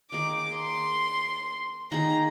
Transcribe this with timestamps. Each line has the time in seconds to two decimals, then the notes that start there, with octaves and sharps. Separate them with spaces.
0.11 D#3 A#3 D#4 G#4 D6
0.56 C6
1.91 D#3 A#3 D#4 G#4 A#5